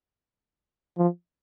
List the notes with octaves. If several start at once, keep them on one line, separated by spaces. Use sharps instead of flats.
F3